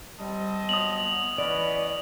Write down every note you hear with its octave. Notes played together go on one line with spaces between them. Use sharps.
G3 C4 D#5 A5
F#3 G3 B3 D#6 F7 F#7
E3 B3 C#4 B4 D5 D#5